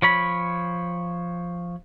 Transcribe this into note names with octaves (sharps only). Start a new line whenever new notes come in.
F3 C#5 B5